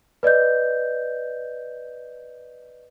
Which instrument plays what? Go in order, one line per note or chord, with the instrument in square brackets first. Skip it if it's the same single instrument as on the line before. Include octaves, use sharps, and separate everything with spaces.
[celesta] B4 D5 D#5 G6